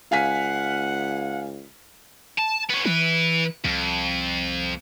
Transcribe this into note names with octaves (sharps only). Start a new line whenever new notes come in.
C#2 F5 F#5 G#5 B6
A5
B3 C#4
E3 E4 B4
C2 F2